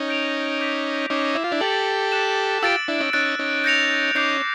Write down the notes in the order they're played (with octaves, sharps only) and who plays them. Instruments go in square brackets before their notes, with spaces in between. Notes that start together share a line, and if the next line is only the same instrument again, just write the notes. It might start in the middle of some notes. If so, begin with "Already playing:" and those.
Already playing: [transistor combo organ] C#4 D#4
[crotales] G6 A#6 D7 F7
D6 G6 B6
[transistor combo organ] C#4 D#4 [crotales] D6 G6 C7 E7
[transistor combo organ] E4
F4
D4 E4
[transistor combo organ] G4 A4 [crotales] A6 C#7 F#7
[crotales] F#6 B6 E7
[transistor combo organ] F4 G4 [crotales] E6 A6 D7
[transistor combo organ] D4 E4
C#4 D#4
[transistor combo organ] C#4 D#4 [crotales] F#6 A6 D7
[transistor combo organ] C#4 D#4
[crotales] G6 A#6 C#7 F7
[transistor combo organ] C#4 D#4 [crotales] D6 G6 C7 F7